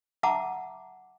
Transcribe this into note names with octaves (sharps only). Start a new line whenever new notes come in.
E5 F#5 A5 A#5 D6